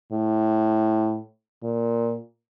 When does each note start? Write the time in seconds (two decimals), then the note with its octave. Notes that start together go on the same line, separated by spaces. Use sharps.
0.12 A2
1.63 A#2